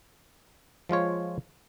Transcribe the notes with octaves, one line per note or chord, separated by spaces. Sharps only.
F3 G#3 F4 C#5